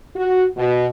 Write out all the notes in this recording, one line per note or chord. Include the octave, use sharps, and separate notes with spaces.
F#4
B2